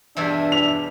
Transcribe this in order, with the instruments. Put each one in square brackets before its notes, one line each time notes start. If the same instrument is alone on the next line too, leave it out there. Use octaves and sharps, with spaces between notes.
[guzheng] E2 B2 E3 [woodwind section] G2 E5 [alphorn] D4
[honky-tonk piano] F7